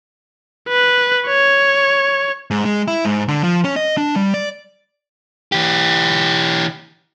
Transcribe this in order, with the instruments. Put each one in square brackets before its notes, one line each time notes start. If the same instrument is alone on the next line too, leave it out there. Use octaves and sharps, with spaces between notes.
[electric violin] B4
C#5
[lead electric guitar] G#2
G#3
E4
G#2
D3
F3
C#4
D#5
D4
G3
D5
E3 G4